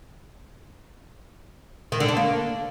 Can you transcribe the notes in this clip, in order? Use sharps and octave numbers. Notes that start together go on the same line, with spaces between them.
D#3
D3
D4
A#3